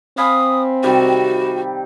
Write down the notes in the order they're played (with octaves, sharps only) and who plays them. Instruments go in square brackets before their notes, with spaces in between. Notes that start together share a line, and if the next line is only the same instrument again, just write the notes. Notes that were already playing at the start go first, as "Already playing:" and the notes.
[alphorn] C4 [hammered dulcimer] F5 G#5 B5 [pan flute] D#6
[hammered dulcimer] C3 D#3 G3 [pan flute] F#4